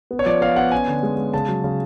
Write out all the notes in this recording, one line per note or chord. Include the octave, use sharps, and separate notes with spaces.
B3
C#5
F3 D5
B3 F5
B3 F#5
C#4 G#5
D3
G#3
G#3
C#3 A5
F#3
C#3